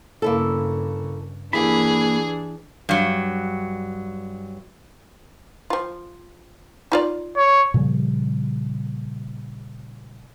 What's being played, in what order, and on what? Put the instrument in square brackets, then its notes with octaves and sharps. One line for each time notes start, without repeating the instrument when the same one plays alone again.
[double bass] G2 C#3 [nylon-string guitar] A#3 E4 A4
[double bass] E3 D4 [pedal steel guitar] A#3 B5 [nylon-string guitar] E4 G4 [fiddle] G#4
[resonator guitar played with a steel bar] G2 F#3
[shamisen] F3 F4
D#4 F4 D5
[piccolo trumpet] C#5
[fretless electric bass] A#2 C#3 F3 G3